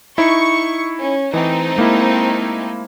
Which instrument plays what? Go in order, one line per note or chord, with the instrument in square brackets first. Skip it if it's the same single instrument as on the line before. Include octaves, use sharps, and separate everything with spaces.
[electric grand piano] D#4 E4 [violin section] C#6
[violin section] C#4
[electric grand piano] E3 D#5 [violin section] A3 C4 D#4
[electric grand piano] G#3 A#3 E4